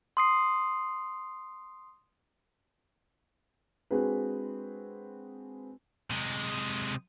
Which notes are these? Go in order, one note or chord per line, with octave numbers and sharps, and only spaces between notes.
C6 D#6 C7
G#3 C4 D4 F#4 G#4 B4
C3 G#3